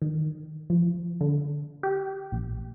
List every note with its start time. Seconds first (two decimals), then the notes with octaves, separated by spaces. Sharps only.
0.02 D#3
0.70 F3
1.21 D3
1.83 G4
2.32 A#1